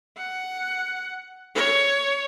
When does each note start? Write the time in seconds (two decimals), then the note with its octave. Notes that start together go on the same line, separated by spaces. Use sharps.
0.17 F#5
1.55 C#5